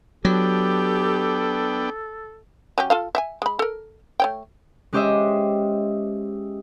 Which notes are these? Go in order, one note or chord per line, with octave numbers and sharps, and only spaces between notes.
F#3 B3 D4 G4 A4 G5
F#3 C#4 G4
F4 A4 F5
E5 F#5 G#5
G#3 B5
A4 A#4
A3 C#5 G5
G#3 C#4 G4 C5 D#5 E5